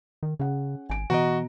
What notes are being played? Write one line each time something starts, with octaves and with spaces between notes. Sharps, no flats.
D#3
C#3 C#4 G#4 F#5
G#1 G#5 D7
B2 E3 F#4 D#5 A#5 D7